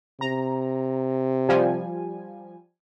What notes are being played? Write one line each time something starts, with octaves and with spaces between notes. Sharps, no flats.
C3 A#5
F3 G3 G#5